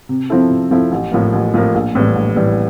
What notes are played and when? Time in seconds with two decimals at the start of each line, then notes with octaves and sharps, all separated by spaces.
0.09 C3
0.30 F3 C4 E4 A4
0.50 C3
0.71 F3 C4 E4 A4
0.92 A1
1.12 A2 F3 A#3
1.33 A1
1.54 A2 F3 A#3
1.75 A#1
1.95 A2 E3 G3
2.16 A#1
2.36 A2 E3 G3